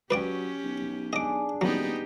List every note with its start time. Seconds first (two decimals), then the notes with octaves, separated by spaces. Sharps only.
0.11 F#3 C#4 G4 B4 D5 G5
0.64 B1
1.13 D4 G#4 D#5 D6
1.61 D#1 F#3 B3 D#4 G4